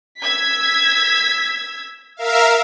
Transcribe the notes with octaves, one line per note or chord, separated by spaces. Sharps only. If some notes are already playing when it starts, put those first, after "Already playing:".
E6 G#6 B6
A#4 E5 F5